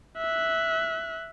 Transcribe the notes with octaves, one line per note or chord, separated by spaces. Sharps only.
E5 F#6